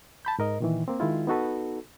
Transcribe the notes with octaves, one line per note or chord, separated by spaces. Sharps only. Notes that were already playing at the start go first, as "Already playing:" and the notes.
A5 B5 G6
G#2 A#4 D#5
A#2 D#3 E3
A#3 C4
D#3 G#3 E4 F4
B3 D#4 F#4 A4 B4